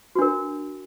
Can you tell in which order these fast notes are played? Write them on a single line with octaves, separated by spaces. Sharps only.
F#4 D4 A#4